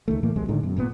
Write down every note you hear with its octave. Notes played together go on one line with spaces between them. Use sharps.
C#2 D#3 A3
A2 E3 A3 A#3
D#1 B1 C3 G#3
A2 D3 D#3 G#3
F#2 B2
G#1 A#2 D3 B3